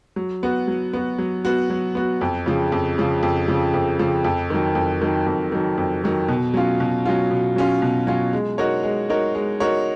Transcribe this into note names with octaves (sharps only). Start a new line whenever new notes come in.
F#3
B3 F#4
F#3
B3 F#4
F#3
B3 F#4
F#3
B3 F#4
F2
C#3 F3
F2
C#3 F3
F2
C#3 F3
F2
C#3 F3
F2
D#3 F#3
F2
D#3 F#3
F2
D#3 F#3
F2
D#3 F#3
B2
F#3 C#4 F4
B2
F#3 C#4 F4
B2
F#3 C#4 F4
B2
F#3 C#4 F4
G#3
D#4 F#4 A#4 C#5
G#3
D#4 F#4 A#4 C#5
G#3
D#4 F#4 A#4 C#5